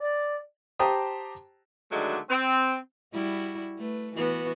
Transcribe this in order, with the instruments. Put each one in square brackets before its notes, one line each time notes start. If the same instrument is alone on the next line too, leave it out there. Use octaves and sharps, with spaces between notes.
[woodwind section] D5
[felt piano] G4 C5 G5 A5 A#5 D#6
[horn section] D3 D#3 F#3 G#3 A3 D4
C4
[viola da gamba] G3 E4 F#4
A3 B4
E3 B3 F#4